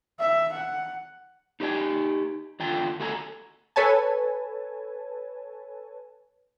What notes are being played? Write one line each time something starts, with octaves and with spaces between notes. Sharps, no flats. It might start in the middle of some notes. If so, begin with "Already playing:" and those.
E5
F#5
D#4 G4 G#4 D5 G5 G#5
E2 D3 F4 G5 A5
A3 F#4 A4 G#5 A#5
A4 B4 C#5 G#5 A5